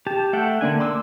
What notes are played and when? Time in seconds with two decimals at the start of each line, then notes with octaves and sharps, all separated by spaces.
0.07 G4 A5
0.33 A3 E5 F#5 G5
0.61 D3 A#3 D4 G#5
0.80 C6 D6 E6